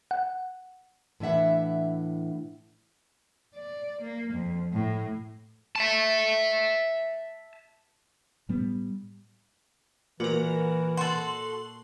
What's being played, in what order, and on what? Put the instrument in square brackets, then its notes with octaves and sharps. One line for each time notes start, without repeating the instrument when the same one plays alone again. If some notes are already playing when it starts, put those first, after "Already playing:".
[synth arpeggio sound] F#5
[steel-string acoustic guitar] A2 E3 D4 E5 F#5
[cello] D5
A#3
F2
A2
[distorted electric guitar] E5 A5
[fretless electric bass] A2 G3 B3
[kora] A#2 [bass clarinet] E3 [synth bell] F#4 A#4
[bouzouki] F#4 A4 [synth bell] C6 F#7